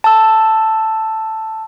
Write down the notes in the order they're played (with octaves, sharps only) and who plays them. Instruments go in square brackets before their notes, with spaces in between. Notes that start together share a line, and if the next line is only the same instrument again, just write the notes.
[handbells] A5 E6